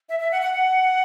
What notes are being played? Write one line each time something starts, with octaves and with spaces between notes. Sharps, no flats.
E5
E5
F#5
F#5
F#5